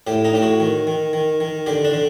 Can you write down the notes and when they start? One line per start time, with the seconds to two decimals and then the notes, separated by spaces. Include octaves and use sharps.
0.07 A2 G4
0.25 D#4
0.33 A2 G4
0.42 F#4
0.60 D#3
0.87 D#3
1.13 D#3
1.40 D#3
1.66 D3 G4
1.85 D4
1.93 D3